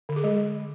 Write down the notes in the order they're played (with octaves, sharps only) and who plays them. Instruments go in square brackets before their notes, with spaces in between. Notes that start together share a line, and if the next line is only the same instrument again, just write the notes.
[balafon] D3
G#4
G#3